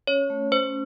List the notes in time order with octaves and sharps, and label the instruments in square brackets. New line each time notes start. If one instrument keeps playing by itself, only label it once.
[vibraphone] C#4 [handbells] C#5
[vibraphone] A3
[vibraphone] C#4 [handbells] C5